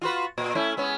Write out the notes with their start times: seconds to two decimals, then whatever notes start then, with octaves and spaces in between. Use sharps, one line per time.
0.01 F4 F#4 B4
0.38 A#2
0.55 A3 C#4 E4
0.77 G#3 B3 C#4